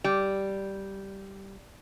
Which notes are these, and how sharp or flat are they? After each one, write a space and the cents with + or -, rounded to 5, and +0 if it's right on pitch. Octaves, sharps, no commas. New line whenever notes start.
G3 -5